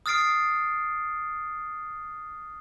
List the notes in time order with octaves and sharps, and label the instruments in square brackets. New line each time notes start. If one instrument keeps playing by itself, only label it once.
[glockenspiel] D#6 F6 A6 C7 D7